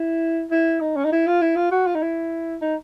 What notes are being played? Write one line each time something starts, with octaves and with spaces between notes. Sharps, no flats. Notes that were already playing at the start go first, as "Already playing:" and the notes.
Already playing: E4
E4
D#4
C#4
D#4
E4
F4
E4
F4
F#4
F4
D#4
E4
D#4